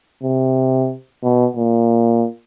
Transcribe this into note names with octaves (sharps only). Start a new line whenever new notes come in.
C3
B2
A#2